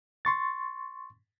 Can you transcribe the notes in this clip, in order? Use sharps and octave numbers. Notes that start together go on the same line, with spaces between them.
C6 C#6 A6